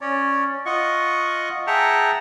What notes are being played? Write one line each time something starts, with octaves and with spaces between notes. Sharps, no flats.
C#4 C#5 D5
F4 D#5 F#5 C#6
G#4 E5 F#5 G5 A5 A#5